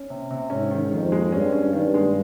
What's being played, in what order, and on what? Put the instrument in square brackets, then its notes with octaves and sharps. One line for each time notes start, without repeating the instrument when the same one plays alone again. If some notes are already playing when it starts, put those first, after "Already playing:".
Already playing: [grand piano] C#4
C3
C3
[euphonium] G#2 [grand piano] C#4
[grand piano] D#3
[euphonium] F2 [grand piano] D#3
[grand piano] G#3
[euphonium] G2 [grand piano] C#4
[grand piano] C#4
[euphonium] G2 [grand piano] D#3
[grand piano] G#3